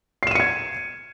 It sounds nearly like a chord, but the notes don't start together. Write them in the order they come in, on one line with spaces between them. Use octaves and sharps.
C7 E7 D#7 C#7 G#6